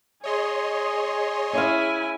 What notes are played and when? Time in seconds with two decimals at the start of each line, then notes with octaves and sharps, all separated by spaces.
0.24 G#4 C#5 D#5 C6
1.53 C#4 E4 E5 F5 G#5